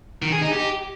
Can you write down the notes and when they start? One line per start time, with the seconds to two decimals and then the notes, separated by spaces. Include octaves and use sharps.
0.22 D#3
0.32 G#4
0.42 D#4
0.52 G4